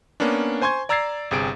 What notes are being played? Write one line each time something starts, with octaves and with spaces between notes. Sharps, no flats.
A#3 B3 C#4 D4
C5 G#5 C6 C#6 G#6
D5 A#5 E6 G#6 A6 C7
G1 C3 G#4 D7